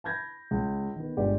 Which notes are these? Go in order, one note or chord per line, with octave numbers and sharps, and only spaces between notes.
A5 B5 G6 G#6 A#6
C#2
D#3 B3
G1 G#3 G4 D5